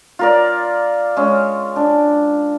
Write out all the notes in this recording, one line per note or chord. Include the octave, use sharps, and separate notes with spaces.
F4 A#4 D5
G#3 C#4
D4